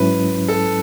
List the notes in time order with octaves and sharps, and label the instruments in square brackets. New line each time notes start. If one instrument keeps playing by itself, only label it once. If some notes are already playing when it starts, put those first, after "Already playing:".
Already playing: [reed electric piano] G#2 F#3 C#4 E4 [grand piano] B4
[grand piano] A4